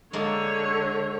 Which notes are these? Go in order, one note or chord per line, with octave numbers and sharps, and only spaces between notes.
D3 G#3 A#3 C#5 D5